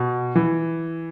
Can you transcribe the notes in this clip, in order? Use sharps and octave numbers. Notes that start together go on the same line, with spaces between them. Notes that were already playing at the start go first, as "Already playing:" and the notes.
Already playing: B2
E3